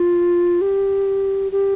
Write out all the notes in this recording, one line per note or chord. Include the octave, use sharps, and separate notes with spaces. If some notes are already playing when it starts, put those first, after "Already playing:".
Already playing: F4
G4
G4